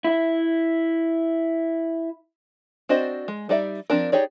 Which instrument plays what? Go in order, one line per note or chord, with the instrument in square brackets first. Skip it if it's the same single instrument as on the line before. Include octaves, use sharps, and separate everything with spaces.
[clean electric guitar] E4 E5
[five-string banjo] C4 D4 F#4 C5 D#5
G#3
G3 D#4 D5 E5
F3 C4 D4 A#4
D#4 G4 G#4 C#5 D5